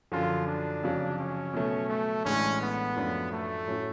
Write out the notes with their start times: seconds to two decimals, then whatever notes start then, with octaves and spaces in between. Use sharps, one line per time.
0.12 F#2 D3 F3 F4
0.47 D4
0.83 F2 C#3 F#3
1.19 C#4
1.53 B2 F#3 A3
1.89 A3
2.25 A1 A2 G#3 C#4 D4
2.61 B3
2.96 F#2 F3 A3 D4
3.32 A3
3.67 A2 F#3 C#4 F#4